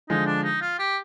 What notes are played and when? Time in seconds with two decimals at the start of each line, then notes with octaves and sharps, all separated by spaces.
0.09 D3 F3 G#3 D#4
0.26 D4
0.44 D#4
0.61 F4
0.79 G4